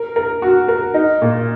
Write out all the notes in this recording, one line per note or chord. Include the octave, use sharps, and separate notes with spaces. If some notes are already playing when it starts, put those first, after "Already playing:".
Already playing: A#4
A#4
F#4
A#4
D#4
A#2